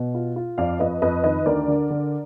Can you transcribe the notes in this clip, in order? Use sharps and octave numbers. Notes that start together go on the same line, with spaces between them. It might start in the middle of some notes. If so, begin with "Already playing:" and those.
Already playing: B2
F4
F4
F2 D5 F5
F2 B4 D#5
F2 B4 D#5
D#3 B4 D#5
D2 A#4 D5
D3
D3